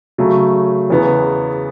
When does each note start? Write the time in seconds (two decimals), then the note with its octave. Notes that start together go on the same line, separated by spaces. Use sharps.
0.18 C#3 F#3 A3
0.90 E2 C#3 E3 B3